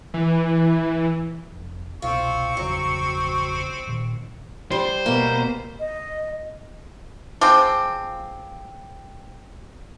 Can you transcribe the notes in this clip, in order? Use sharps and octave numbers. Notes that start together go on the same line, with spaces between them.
E3
F1
C2 B2 C4 F4 C#6
G1 E2 C#3 F#3
A#2 D#3
G3 C5
B2 A#3
D#5
F3 G#3 C4 D6